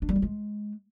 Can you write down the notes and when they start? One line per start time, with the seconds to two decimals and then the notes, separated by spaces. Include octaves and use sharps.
0.02 D4
0.09 G3
0.15 A#3
0.22 G#3